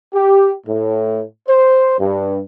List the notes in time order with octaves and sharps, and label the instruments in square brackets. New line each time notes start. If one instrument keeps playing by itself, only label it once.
[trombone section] G4
A2
C5
G2